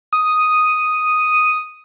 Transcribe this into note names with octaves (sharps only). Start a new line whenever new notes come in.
D#6